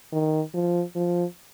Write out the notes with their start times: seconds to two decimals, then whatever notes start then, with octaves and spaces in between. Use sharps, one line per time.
0.13 D#3
0.54 F3
0.96 F3